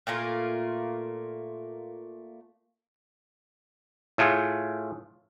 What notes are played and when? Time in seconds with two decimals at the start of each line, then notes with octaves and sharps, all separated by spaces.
0.07 A#2 A3 A#3 F4
4.18 A2 A3 F4 G#4